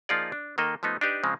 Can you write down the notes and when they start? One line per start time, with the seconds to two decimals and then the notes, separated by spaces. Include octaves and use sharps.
0.09 F3 A#3 D#4 F4 G#4 D5
0.32 D4
0.58 D#3 A#3 A4 D#5
0.83 F3 A3 B3 D#4
1.01 D4 D#4 G4 B4
1.23 C#3 F3 G#3 C4